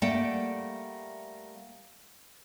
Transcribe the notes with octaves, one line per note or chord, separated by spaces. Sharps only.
G3 A3 A#3 F#5 G5